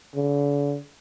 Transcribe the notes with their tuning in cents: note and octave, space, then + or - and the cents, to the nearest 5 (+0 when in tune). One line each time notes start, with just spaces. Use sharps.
D3 -45